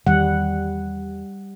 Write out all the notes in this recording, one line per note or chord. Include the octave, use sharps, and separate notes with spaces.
E2 D#3 G3 F#5